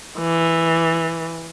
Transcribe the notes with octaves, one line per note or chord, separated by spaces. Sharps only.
E3